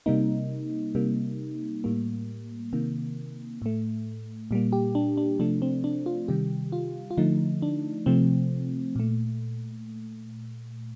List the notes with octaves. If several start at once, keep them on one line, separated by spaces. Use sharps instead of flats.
C3 G3 A#3 D#4
C3 G3 A#3
A2 G3 A#3
C3 D#3 A#3
A2 A3
A#2 G3 A#3
G4
D4
D4
C3 F3 A3 D4
C4
D4
F4
C3 D#3 G3 G4
F4
F4
D3 F3 A3 D#4
D4
C3 F3 A3 C4
A#2 A3